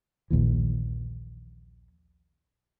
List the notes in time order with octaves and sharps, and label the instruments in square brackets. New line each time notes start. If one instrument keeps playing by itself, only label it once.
[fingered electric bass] A#1 D#2 A#2 E3